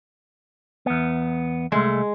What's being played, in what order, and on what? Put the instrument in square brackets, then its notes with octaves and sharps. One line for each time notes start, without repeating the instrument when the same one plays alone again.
[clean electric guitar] E2 B3
[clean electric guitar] C2 A3 [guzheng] G#3